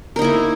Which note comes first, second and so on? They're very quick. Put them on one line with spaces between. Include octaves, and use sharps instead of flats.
A#4 D#4 A#3 E4